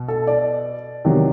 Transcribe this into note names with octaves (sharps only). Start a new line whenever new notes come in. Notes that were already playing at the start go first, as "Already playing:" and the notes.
Already playing: B2
A4
D5
C3 D#3 F#3